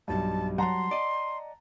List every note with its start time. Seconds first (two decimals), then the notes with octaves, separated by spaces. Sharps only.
0.08 B1 G2 A5
0.58 F#3 G3 F#5 A5 A#5 C6
0.91 D5 D#5